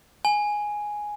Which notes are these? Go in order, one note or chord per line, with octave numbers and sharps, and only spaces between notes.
G#5